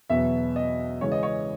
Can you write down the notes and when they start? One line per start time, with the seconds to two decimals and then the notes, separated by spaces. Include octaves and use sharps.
0.10 E2 B2 F#3 B3 E5
0.56 D#5
1.01 C#2 C#3 E3 G#3 C#5
1.12 D#5
1.23 C#5